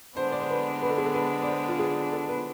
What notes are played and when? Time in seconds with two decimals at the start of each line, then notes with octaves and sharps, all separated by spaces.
0.17 D3 G#3 B3 D4 C5
0.32 D5
0.41 C5
0.50 B4
0.82 B4
0.90 A4
0.98 G#4
1.06 A4
1.14 B4
1.42 D5
1.47 C5
1.68 F4
1.79 G#4
2.13 A4
2.29 B4